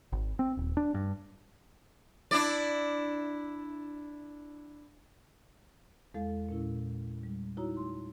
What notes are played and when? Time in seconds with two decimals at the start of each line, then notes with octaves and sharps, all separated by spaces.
0.12 G#1
0.39 C4
0.57 D#1
0.77 D4
0.94 G2
2.31 D4 E4 D5
6.14 E2 G#3 A4 F5
6.49 A#2 C#4 E4
7.23 G3
7.57 D#4 E4 F#4 C#5 A#5
7.77 A3 C6